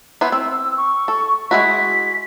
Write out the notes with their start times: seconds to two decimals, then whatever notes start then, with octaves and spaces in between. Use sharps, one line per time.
0.21 B3 E4 C5
0.32 C4 E6
0.77 C#6
1.08 A4
1.51 G#3 E4 F#4 B6